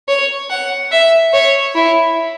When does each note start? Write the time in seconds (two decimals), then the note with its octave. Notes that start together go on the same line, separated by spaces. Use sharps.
0.08 C#5
0.50 F#5
0.92 E5
1.33 C#5
1.75 E4